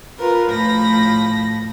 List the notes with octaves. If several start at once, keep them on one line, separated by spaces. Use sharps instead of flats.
F4 A#4 B4
A2 F3 B5 A#6